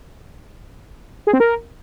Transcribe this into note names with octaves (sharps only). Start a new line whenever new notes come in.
G#4
C4
A#4